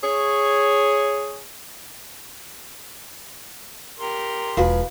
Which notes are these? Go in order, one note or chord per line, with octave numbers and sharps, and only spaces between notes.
G#4 C#5
G4 A#4 C6
E1 F3 E4 F#4 G#4 B4 F5